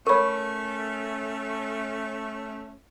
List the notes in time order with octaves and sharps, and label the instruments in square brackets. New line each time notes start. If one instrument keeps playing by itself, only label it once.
[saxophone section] A3 C#4 [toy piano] A#4 C#5 [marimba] B5 C#6